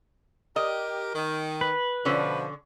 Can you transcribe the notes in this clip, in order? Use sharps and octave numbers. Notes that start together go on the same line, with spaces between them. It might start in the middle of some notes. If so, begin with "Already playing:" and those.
G4 A#4 D#5
D#3
B4
B2 D3 F3 C#4